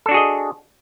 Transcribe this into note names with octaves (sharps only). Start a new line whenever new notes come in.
D4 F#4 G#4 A4 D#5